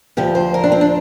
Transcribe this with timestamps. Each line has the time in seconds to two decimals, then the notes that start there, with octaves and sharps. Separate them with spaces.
0.17 D2 D3 F3 G4
0.35 C5
0.54 A#4
0.64 D4
0.72 C4
0.81 D4